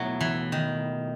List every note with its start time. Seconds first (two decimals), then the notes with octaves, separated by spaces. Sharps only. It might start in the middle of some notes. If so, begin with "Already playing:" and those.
Already playing: B2 F#3 A3 E4
0.21 E3
0.52 D#3